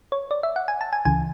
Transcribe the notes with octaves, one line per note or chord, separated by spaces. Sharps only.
C#5
D5
E5
F#5
G#5
A5
G#5
C#2 C#3 E3 G#5